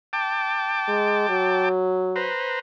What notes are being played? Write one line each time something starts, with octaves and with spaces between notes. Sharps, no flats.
G5 A5 D6
G#3
F#3
B4 C5 A#5